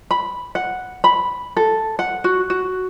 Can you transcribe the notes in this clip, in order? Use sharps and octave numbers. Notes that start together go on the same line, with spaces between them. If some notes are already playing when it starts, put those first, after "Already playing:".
B5
F#5
B5
A4
F#5
F#4
F#4